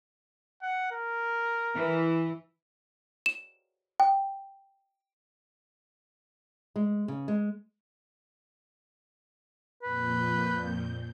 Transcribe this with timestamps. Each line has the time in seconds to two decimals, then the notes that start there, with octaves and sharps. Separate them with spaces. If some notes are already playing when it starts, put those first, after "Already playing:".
0.62 F#5
0.92 A#4
1.74 E3
3.26 E7
4.00 G5
6.76 G#3
7.08 C#3
7.28 G#3
9.83 F2 A#2 B4 G6